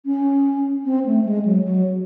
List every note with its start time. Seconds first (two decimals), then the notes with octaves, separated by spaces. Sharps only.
0.06 C#4
0.85 C4
1.06 A3
1.25 G#3
1.45 F#3
1.64 F#3